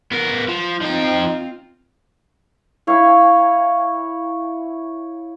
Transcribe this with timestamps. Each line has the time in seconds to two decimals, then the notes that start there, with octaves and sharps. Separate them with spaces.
0.12 B3 A#4
0.48 F3
0.81 F3 C4 D#4 F4 G5
2.87 E4 C#5 F5